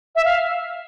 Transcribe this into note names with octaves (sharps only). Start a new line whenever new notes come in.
E5
F5